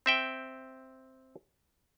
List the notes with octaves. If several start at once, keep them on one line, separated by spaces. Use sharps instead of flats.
C4 E5 G5